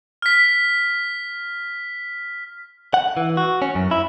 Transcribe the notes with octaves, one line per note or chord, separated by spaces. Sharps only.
F6 B6
F#5
E3
F#4
C#4
F#2
E4